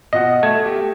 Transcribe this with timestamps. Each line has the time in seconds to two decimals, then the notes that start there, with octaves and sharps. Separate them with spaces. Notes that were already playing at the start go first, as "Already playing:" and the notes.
0.13 B2 F4 D#5 F#5
0.43 A3 G#6 E7
0.64 G4